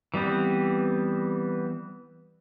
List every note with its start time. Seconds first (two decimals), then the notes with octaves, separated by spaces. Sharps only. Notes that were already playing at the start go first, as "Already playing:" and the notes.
0.14 E3 G3 B3 C4